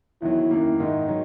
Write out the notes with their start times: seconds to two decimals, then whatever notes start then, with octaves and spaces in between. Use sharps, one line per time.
0.22 E2 D#3 F#3 E4
0.51 F#2 D#3 A#3
0.80 G#2 D#3 G#3 D#4
1.08 D#3 F#3